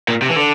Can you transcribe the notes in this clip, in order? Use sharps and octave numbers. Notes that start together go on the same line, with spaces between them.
A#2
C3
E3
D3